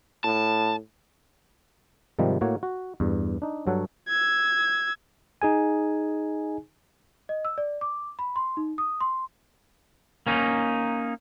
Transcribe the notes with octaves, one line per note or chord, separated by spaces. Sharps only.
A2 A5
G#2 C3 D#3 F3 G3
A2 A#3 F#4 C#5
F#4
E2 G2
D4 D#4
G2 F#3 A4 C#5 F#5
E6 G#6
D#4 G#4 G#5
D#5
E6
D5
D6
B5
C6
D#4
D#6
C6
A#3 C#4 D#4